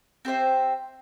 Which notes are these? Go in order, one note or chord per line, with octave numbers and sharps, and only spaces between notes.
C4 G4 C5 E5